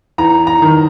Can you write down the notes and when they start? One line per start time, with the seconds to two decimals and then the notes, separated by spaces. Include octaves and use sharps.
0.18 E2 A#5
0.47 A#5
0.62 D#3